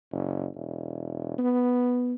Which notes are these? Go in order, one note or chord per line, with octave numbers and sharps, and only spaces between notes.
F#1
E1
B3